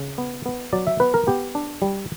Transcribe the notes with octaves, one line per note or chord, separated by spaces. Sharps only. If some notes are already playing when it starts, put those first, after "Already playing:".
Already playing: C#3
B3
B3
F#3 D5
E5
B3 B4
A#4
B3 G4
D4
G3